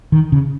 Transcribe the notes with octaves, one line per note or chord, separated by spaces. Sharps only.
D#3
C#3